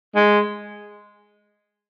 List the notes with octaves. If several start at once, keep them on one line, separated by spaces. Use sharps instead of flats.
G#3